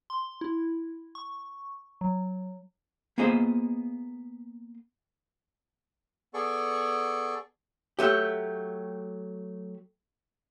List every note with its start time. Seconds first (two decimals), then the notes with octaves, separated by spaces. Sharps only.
0.10 C6
0.41 E4
1.15 C#6
2.01 F#3
3.18 A#3 B3 F4 G#4 C5 D#5
6.34 B3 G#4 A4 D5 C#6
7.99 F#3 A3 G4